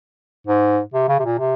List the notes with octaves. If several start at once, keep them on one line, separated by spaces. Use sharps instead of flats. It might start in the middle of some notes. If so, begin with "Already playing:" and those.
G#2
C3
C#3
C3
A#2
C3